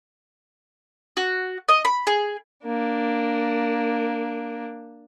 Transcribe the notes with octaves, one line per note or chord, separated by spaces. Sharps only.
F#4
D#5
B5
G#4
A#3 D4